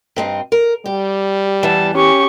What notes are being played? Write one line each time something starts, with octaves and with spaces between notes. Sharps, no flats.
G2 C4 D#4
A#4
G3 G4
E2 E3 A5
C#4 G4 C#6